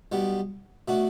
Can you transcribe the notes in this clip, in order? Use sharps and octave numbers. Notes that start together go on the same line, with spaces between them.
B1 B2 G3 B3
B2 A3 D4 F#4